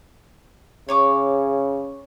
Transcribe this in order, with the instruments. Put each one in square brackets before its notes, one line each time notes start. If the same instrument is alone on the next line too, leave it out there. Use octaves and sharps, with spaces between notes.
[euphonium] C#3 [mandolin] C#5 C#6 D6